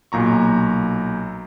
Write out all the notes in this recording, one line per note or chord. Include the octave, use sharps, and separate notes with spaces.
B1 A#2 A#5 C#6